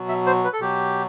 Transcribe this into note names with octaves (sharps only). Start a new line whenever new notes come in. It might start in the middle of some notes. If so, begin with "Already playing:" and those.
Already playing: B2 F#3
E5
C5
B4
A4
B2 F#3 G4